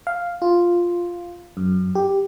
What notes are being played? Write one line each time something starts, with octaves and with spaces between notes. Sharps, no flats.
F5
F4
F#2
G4